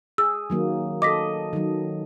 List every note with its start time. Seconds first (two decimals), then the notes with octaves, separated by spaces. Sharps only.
0.18 G#4 E6
0.50 D#3 F#3 A#3
1.02 A4 D#5 D6 A#6 B6
1.53 D#3 F#3